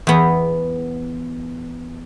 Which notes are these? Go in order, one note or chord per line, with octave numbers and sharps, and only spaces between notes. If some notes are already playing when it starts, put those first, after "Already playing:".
E2 B3